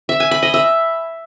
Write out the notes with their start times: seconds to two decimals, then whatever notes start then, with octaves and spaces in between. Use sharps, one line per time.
0.09 E5
0.20 G#5
0.31 B5
0.42 D#5
0.54 E5